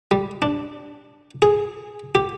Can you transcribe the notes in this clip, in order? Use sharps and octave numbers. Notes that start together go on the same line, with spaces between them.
G3
D4
G#4
G4